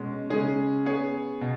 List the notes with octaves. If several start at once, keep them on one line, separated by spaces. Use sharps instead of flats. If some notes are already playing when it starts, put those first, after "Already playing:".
Already playing: B2 G#3 C#4
C#3 G#3 C#4 G#4
B3 G#4 C#5
B2